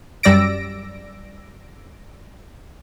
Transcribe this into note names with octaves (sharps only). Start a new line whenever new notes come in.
F#2 G3 D5 E6 A#6 D7